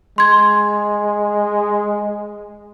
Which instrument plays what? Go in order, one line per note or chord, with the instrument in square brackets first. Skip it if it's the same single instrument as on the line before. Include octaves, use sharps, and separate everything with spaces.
[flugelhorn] G#3 [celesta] C6 G#6